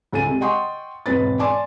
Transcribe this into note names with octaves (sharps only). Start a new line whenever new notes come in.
C#2 A4 G#5 A6 D#7
C3 G#3
D#5 F#5 G5 C6 C#6 D#6
E1 G#2 C4 B4 A6
D5 G#5 A5 C6 D6